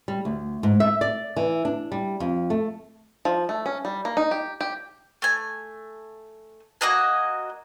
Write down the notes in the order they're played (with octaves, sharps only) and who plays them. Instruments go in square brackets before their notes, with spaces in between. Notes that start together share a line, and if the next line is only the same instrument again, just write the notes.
[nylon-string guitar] G3
D2
G#2
E5
D5
E3
D4
G3
F2
A3
[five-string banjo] F3
A3
C#4
G3
A#3
D#4
G4
G4
[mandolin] A3 G#5
A#3 F#4 D#5 G#5